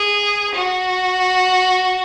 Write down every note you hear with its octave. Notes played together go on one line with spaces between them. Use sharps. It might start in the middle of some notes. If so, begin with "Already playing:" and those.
Already playing: G#4
F#4